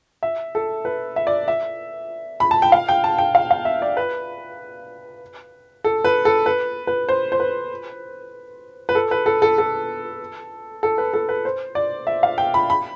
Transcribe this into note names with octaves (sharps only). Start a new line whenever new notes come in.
E5
A4
B4
E5
D5
E5
B5
A5
G5
F5
G5
A5
G5
F5
F5
E5
D5
B4
A4
B4
A4
B4
B4
C5
C5
B4
B4
A4
B4
A4
A4
A4
A4
B4
A4
B4
C5
D5
E5
F5
G5
B5
B5